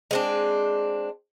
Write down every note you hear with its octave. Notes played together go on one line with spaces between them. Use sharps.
G#3 C4 D4